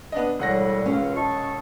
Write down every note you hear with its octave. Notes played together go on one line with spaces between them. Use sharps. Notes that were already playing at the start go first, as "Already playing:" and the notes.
B3 D4 D#5
E1 A2 G3 F#5 A#6
C#2 C#4 F4 F5
D#5 A5 C#6